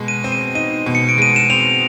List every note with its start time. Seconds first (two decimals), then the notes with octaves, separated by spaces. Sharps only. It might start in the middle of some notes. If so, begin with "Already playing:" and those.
Already playing: B2 G#3
0.08 D#7
0.24 C4
0.32 D#7
0.55 D#4 D#7
0.86 B2
0.95 C#7
1.09 D7
1.18 G#3 D#7
1.36 E7
1.50 C4 F7